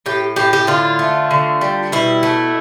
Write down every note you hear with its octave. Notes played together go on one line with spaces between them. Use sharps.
A2 G4
A2 G4
G4
D3 F4
A3
D3
G3
B2 E4
A3